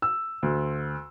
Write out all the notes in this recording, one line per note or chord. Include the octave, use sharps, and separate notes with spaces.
E6
D2